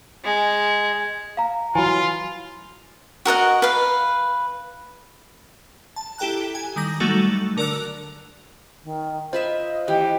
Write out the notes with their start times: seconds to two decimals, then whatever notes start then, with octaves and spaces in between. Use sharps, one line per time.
0.24 G#3
1.37 F5 A#5
1.75 E3 F#3 F4 G#5 B5 C6
3.25 F#4 A#4 D#5 F#5
3.62 B4 F5
5.96 A5
6.18 E4 G4 A4 G5 A#5 F#6
6.55 G#5
6.76 D#3 G3 D#6 A#6
7.00 F#3 G3 A3 D#4 F#4 A4
7.57 D3 A#4 D5 D6 E6 F#6
8.84 D#3
9.33 F4 B4 C5 D#5 E5
9.88 E3 G4